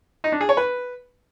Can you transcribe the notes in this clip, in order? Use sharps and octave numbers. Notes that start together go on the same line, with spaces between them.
D#4
D4
G#4
C#5
B4